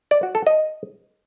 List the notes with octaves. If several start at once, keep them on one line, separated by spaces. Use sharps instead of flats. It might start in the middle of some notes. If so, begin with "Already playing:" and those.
D5
F#4
A4
D#5